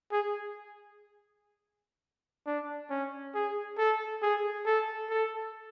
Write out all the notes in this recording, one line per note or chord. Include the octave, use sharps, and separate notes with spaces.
G#4
D4
C#4
G#4
A4
G#4
A4
A4